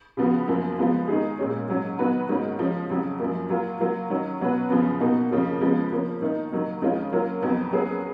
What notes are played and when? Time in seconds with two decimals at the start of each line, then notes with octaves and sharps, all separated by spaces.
0.17 C#3 F3 B3 F#4
0.48 F#2 F3 A#3
0.78 F3 G#3 B3 F4
1.08 D#3 G#3 D#4 G#4
1.39 A#2 G#3 C#4
1.68 G#2 F#3 C#4
1.99 D#3 F#3 B3 F#4 B4
2.29 G#2 D#3 A#3 C#4 F#4
2.59 F3 G#3 C#4
2.89 F2 C#3 F#3
3.20 F#2 F3 A#3
3.50 F#3 A#3 F4 A#4
3.80 F#3 A#3 F4
4.10 D#3 F#3 C#4
4.41 B2 F#3 C#4 F#4 B4
4.70 F#2 C#3 F3 B3
5.00 B2 A#3 D#4 F#4
5.31 F2 C#3 F3 A#3 C#4
5.61 C#3 F3 G#3 B3
5.92 F3 A#3 C#4
6.22 D#3 A#3 D#4
6.52 D#3 F#3 A#3
6.82 F2 D#3 G#3 C#4 F4
7.12 F#3 A#3 C#4 F4 A#4
7.42 F2 D#3 F#3 B3
7.72 F#3 A#3 C#4 G#4 B4